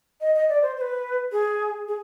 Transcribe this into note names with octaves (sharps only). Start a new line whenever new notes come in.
D#5
D#5
D5
C5
C5
B4
G#4
G#4